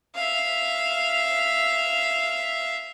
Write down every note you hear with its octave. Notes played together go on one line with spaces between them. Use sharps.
E5 F5